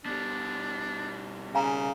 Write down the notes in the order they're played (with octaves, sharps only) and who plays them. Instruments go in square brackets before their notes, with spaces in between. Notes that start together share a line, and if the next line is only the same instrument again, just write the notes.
[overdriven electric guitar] B2 G3 [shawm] D4
[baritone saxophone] C#3 [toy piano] F5 G#5 A#5